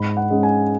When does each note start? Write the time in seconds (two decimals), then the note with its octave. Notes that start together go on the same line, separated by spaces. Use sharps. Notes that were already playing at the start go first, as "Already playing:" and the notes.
Already playing: G#2 B5
0.17 F#5
0.31 G#3 C#4
0.43 G#5